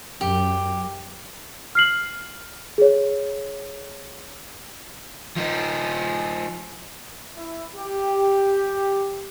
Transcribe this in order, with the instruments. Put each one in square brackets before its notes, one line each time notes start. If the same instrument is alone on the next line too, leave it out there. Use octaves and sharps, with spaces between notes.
[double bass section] F#2 [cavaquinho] G4
[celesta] F6 C7 F#7
G#4 C#5
[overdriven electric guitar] F3 D#4
[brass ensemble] E4
G4